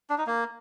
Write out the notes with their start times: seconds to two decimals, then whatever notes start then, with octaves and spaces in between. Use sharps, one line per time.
0.10 D4
0.18 D#4
0.26 A#3